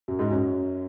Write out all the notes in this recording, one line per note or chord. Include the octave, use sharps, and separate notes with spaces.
F#2 F#3
G#2 G#3
F#2 F#3